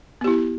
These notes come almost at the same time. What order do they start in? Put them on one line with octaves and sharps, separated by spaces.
B3 G4 E4